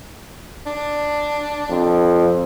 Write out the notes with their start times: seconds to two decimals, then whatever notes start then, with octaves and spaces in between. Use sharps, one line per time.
0.67 D4
1.70 F2